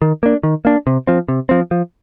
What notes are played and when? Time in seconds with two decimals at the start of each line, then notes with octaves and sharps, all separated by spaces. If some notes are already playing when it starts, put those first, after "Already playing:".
0.02 D#3
0.23 A#3 D4
0.43 D#3
0.65 A#3 D4
0.87 C3
1.07 F3 C4
1.28 C3
1.49 F3 C4
1.71 F3